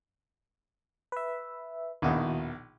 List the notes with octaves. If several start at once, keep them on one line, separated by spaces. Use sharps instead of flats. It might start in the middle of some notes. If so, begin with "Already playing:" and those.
B4 E5
A#1 D#2 B2 D#3 E4 F#4